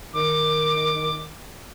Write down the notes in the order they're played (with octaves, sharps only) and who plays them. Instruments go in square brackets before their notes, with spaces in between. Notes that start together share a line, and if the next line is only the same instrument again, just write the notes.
[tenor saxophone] D#3 [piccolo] D6